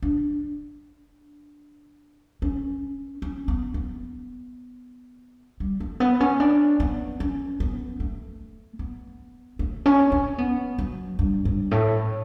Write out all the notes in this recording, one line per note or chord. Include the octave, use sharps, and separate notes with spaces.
D4
C#4
C#4
B3
B3
G3
A3
B3
C#4
D4
B3
C#4
B3
A3
B3
A3
C#4
C#4
B3
F#3
G2
G2
A2